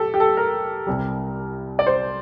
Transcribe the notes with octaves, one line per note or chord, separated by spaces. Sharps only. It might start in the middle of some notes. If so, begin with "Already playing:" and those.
Already playing: G4 A4
G4
A4
A#4
C2 C3 G3
D5
C5